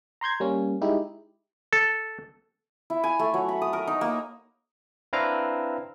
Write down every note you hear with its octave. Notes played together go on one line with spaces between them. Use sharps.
A#5 C6 G6 G#6
G3 A#3 C#4
G#3 D#4 E4 G4
A4
E4
G#5
A3
F#3
B5
D#6
A#4
D#4
A#3
C4 D4 E4 B4 F5 A#5